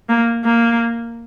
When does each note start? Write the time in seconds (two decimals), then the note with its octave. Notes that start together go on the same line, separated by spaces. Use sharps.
0.09 A#3
0.45 A#3